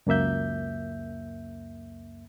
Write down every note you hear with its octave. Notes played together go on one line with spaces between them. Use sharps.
C#2 F#2 A#3 E5 G6